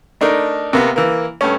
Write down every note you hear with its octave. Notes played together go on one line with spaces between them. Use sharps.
A3 D4 D#4 A#4
C3 A#3 B3
E3 A#3
G2 A3 C#4